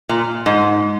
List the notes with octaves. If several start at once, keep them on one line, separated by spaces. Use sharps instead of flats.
A#2
G#2